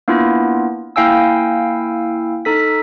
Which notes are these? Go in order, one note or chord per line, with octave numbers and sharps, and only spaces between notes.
A#3 B3 D4 E4 F4
A#3 E4 F5 G5 G#5 E6
D#4 A4 B6